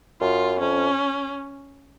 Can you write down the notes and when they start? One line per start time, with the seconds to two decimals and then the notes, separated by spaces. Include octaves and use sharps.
0.21 F#2 F4
0.60 F2 C#4